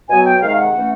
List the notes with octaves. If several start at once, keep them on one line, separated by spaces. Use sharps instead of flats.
B2 F#3 B3 G#5
G5
C3 D#3 G#3 F5
F#5
E3 A3 C#4